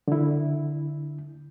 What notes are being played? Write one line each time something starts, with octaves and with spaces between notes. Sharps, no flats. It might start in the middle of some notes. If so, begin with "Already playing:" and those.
D3 E4